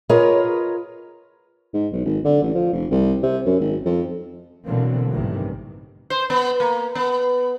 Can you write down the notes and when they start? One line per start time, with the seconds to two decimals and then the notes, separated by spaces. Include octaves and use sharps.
0.09 F4 G#4 A#4 B4 C#5 D#5
1.74 G#2
1.92 B1
2.05 G#1
2.25 D3
2.43 A1
2.55 F3
2.73 F1
2.91 C2
3.23 C3
3.46 F#2
3.60 G#1
3.86 F2
4.65 B2 D3 E3 F#3 A#3 C4
5.11 A1 G2 C3 D#3 E3
6.10 C5
6.30 B3
6.60 A#3
6.95 B3